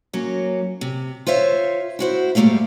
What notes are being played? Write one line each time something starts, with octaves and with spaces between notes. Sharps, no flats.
F#3 A#3 C#4
C3
F4 C5 C#5 E5 F5
E4 F#4 C5
G#2 G3 A3 A#3 E4 F5